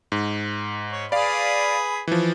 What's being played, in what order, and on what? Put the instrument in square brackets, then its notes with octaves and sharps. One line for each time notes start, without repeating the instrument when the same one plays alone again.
[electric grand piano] G#2
[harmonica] C#5
[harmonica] G#4 B4 B5 [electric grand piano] D5 F5
[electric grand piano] E3 F3